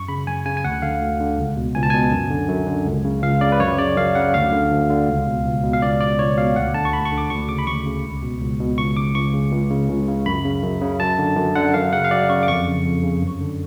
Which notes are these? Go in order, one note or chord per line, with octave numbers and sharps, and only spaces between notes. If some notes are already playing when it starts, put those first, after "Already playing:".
Already playing: F#2 C#6
C#3 B5
F#2 G#5
C#3 G#5
G#5
D2 F#5
D3 F5
D2
D3
C#2
B2
C#2 G#5
A5
B2 G#5
F#2
D3
F#2
D3
C#2
C#3
C#2 F5
C#3 D5
B4
F#2 C#5
C#3 D5
F#2 F5
C#3 F#5
D2 F5
D3
D2
D3
C#2
B2
C#2
B2
F5
C#2 D5
B2 D5
C#2 C#5
B2 F5
D2 F#5
D3 A5
C#6
D2 B5
C#6
D3
D6
D2 C#6
C#3 D6
B5
D2 C#6
C#3
C#2
B2
C#2
B2
C#2 C#6
C#3 D6
C#2 C#6
C#3
C#2
C#3
C#2
C#3
F#2 B5
C#3
F#2
C#3
F#2 A5
D3
F#2
D3 F#5
F#2 F5
C#3 F#5
F5
F#2 D5
C#3 C#6
D6
F2 C#6
C#3
F2
C#3
F#2
D3